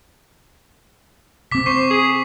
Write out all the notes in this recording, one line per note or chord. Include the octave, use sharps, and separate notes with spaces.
C3 C4 D6 B6
C5 C#6 C7
G#4